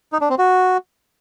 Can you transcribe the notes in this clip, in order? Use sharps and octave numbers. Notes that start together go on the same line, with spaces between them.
D#4
D4
C4
F#4